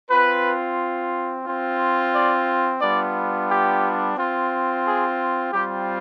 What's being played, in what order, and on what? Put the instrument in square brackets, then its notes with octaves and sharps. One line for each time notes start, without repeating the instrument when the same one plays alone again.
[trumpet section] C4 F4 B4
C4 F4
D5
G3 B3 D4 F4 D5
G4
C4 F4
G#4
G3 C4 F4 G4